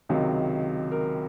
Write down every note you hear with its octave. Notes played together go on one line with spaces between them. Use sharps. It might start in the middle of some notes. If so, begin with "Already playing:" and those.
C#2 C3 D#3 F#3
A#4